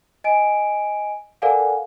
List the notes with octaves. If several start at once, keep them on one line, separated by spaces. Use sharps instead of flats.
D#5 G#5 D7
A4 A#4 D5 F5 F#5 G#5